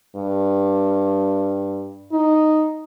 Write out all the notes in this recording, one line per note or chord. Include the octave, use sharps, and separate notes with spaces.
G2
D#4